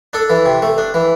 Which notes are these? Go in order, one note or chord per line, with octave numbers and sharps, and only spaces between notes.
D4 A4
E3
C3
A3
D4
E3